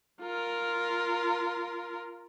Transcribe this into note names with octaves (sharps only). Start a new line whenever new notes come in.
F4 A#4